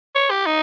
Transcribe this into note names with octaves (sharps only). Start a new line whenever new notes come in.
C#5
G4
D#4